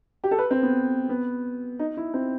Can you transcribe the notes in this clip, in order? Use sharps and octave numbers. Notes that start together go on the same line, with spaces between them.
G4
A4
B4
C4
B3
B3
D#4
E4
C4